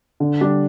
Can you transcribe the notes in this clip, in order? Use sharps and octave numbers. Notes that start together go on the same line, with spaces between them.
D3
G3 D4